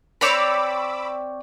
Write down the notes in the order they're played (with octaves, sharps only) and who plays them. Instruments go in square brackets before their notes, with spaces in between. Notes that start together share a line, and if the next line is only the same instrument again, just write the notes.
[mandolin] C4 C#5 D5 [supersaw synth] B5 D6 E6